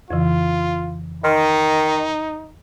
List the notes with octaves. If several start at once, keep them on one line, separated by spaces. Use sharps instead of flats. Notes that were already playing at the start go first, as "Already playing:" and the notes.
F2 C#3 E3 F4
D#3 D#4 A#5 C6 F6